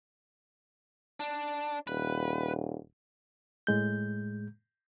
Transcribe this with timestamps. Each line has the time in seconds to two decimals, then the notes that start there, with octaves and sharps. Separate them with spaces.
1.20 D4
1.87 D#1 B4
3.67 A2 G#3 G6